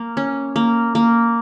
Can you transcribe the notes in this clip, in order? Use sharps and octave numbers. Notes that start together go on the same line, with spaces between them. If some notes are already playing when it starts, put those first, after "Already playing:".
Already playing: A#3
C#4
A#3
A#3